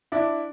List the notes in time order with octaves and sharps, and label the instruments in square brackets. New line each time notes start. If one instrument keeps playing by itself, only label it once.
[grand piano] D4 E4